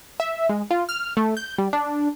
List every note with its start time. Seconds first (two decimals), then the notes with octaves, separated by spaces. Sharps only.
0.20 E5
0.49 G#3
0.71 F4
0.89 F6
1.17 A3
1.37 G6
1.58 G3
1.73 D4